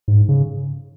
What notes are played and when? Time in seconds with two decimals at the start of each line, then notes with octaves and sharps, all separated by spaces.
0.08 G#2
0.29 C#3